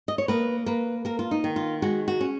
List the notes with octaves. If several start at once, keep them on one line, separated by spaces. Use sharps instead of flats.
D#5
C#5
A#3 B4
A#3 B4
A#3 A#4
F4
D#4
D#3
F4
G#3 F#4
F#4
C#4